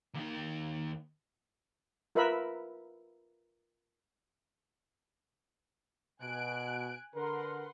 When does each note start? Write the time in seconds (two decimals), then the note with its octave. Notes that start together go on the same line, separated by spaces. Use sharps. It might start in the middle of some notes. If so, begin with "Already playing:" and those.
0.15 D#2 D#3
2.15 F4 A#4 B4 E5 B5
6.21 B2 G#5 F#6 D7
7.15 D3 A#4 B4 F#5 C6